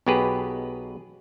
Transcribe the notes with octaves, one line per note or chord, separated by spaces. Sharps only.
B1 B2 B3 G4 G#4 B4